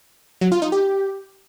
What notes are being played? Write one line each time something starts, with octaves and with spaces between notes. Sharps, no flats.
F#3
F4
D#4
G4